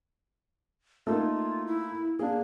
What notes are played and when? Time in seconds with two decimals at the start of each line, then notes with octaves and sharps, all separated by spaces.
1.07 A3 A#3 D#4 F4
1.67 E4
2.19 A#3 D4 G#4